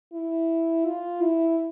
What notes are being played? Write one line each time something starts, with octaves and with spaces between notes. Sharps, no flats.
E4
F4
E4